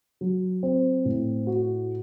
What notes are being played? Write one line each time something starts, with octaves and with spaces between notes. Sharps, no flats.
F#3
C4
A2
F#4